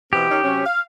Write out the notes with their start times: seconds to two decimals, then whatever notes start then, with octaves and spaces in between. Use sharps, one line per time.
0.13 B2 E3 C4 G4
0.29 D#3 C#4 D#4
0.43 C3 F#3 C#4
0.65 F5